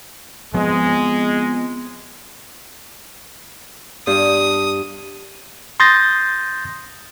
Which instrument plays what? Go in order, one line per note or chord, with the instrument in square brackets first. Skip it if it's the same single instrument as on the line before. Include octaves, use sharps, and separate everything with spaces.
[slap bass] F3 B3 C4 [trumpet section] G#3
[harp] G2 [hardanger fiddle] D#6
[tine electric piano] C6 D#6 G6 A6 A#6